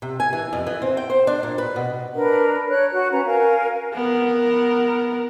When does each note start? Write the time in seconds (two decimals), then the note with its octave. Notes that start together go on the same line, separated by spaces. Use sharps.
0.02 C3
0.20 G#5
0.33 E3
0.53 F2
0.67 E3
0.82 C4
0.97 G5
1.10 C5
1.27 D4
1.43 A#2
1.58 B4
1.76 B2
2.14 D4 A#4 B4
2.68 C#5 F#6
2.92 F#4 F#6
3.11 C#4 B4 A#5
3.25 A#4 F5 G#5
3.94 B3 A#4